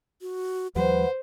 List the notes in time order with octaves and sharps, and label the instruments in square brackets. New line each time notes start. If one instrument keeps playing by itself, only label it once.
[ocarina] F#4
[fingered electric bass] D#2 F3 G3 [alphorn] B4 [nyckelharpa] C5 [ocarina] F#5